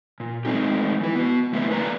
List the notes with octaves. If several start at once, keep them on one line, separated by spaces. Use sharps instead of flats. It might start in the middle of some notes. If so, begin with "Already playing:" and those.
A#2
G#3 A3 C4 D#4 G4
E3 E4
B3 F#4
C#3 A3 C4 E4 A#4 B4
A#3 B4 D5 F5 A#5